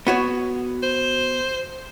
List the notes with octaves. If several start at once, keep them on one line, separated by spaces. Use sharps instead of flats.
B3 F#4 C#5
C5